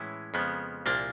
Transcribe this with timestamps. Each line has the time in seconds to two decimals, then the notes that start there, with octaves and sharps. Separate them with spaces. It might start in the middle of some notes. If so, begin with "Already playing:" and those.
Already playing: A2 E3 G#3 C#4 E4
0.34 F2 C#3 F3 G#3 B3
0.86 C2 A#2 F3 A#3 D4